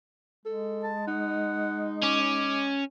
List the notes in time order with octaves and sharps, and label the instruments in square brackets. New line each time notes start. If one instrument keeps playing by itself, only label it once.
[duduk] G#3 [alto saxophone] A4
[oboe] A5
[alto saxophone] D#4 [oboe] F#5
[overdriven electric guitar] C#4 [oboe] D6